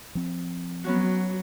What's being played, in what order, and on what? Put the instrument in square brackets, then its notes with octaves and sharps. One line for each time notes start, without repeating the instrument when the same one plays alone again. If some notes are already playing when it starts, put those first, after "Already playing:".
[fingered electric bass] F3 C4
[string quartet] F#3 [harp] B3 C#4 F#4